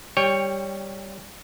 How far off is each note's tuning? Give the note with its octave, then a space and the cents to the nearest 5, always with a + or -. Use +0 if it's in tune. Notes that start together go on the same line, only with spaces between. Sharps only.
G3 +0 C#5 +0 G5 +25